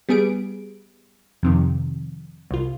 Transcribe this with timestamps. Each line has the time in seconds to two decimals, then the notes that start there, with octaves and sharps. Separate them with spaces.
0.09 G3 B3 G#4 D7
1.43 F2 C3 D#3
2.51 C2 F4